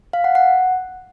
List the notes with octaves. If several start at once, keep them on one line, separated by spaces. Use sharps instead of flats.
F5
F#5
F#5